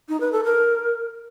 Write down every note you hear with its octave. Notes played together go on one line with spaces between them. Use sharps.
D#4
B4
A4
A#4